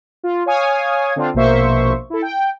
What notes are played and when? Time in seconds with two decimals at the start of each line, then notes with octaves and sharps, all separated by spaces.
0.24 F4
0.46 C#5 F5 G#5 D#6
1.16 D3 C4 D4 F4
1.34 A#1 B2 A#3 C5 E5 C#6
2.10 E4 A4
2.22 G5